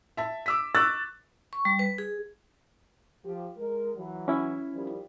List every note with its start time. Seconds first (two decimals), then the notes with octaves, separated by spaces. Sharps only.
0.17 E5 A5
0.46 D6 E6 B6
0.75 C#6 D6 E6 F#6 A6
1.53 C#6
1.65 G3
1.79 B4
1.98 G#4
3.24 F3 G4
3.57 G#3 A#4
3.96 E3 F#3
4.28 C#4 E4
4.74 D#3 F3 G3